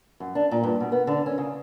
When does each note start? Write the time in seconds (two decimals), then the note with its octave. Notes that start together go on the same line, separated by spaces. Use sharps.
0.20 F#2
0.35 D4
0.51 A#2
0.63 G2
0.80 B2
0.92 B3
1.07 D3
1.26 C#4
1.38 C#3